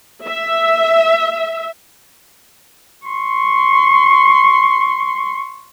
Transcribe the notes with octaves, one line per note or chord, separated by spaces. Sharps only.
E5
C6 C#6